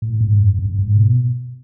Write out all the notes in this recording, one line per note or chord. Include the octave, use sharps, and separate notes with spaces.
A2
G#2
F#2
G2
G#2
B2